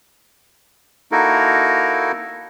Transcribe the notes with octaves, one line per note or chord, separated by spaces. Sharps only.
A#3 D#4 E4 F#4 A4 A#4